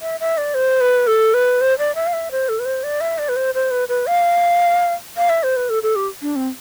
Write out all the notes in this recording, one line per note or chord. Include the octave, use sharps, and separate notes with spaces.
E5
E5
D5
C5
B4
A4
B4
C5
D5
E5
F5
E5
C5
A4
B4
C5
D5
E5
D5
B4
C5
C5
B4
B4
F5
F5
E5
C5
B4
A4
A4
G4
D4
C4